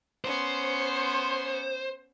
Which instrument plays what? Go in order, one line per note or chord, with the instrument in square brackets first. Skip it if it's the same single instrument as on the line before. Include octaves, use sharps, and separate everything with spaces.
[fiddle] B3 C#4 [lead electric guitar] C5